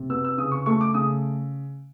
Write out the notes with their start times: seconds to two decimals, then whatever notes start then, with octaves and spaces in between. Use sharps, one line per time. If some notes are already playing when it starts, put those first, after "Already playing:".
Already playing: C3
0.10 B3 E6
0.24 E6
0.38 C#3 D#6
0.52 C#6
0.66 A3 C#6
0.81 D6
0.94 C#3 D#6